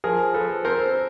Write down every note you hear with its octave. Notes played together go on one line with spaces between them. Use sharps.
F3 G#4 A#4
F3 A4 B4
C4 A#4 C5